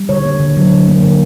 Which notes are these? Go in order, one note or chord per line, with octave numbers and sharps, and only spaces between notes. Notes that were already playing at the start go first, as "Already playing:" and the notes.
Already playing: G3
D3 C#5
A#3
D3
F#3
D3
A#3
D3